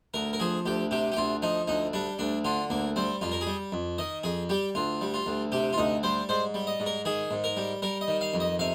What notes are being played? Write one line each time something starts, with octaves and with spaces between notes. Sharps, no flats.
D2 A#4
A#4
F3 G#4
D2 G4
C3 G4
G4
D2 F4
F3 D#4
D2 D#4
G3 D4
D2 D4
D3 F4
D2 A#3
G3 C4
F2 F4
A#4
G#4
G3
F2
D#3 D#5
F2 G#4
G3 G4
D2 F4
G3
F4
D2
C3 G4
F4
D2 D#4
G3 C5
G#2 C5
G3
D#5
G#2
A#4
D#3 G#4
G#2
A#4
G3
G3 A#4
D#5
D#3
F5
F2
D#5
C3 F5